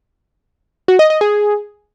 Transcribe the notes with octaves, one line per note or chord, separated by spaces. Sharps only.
F#4
D#5
D#5
G#4